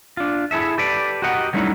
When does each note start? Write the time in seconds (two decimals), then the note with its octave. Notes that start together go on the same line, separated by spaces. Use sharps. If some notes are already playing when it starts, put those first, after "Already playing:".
0.17 D4 F4
0.51 E4 G#4 A4 E5
0.78 G4 A4 B4 D5
1.22 F#4 G4 A#4 D#5 F#5
1.53 F#3 G3 A3 C#4 D#4 E4